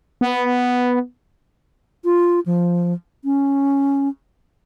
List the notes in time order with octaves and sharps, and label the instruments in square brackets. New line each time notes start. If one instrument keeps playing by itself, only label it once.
[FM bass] B3
[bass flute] F4
F3
C#4